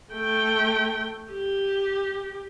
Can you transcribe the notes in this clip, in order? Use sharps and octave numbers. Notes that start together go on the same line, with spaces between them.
A3 G5
G4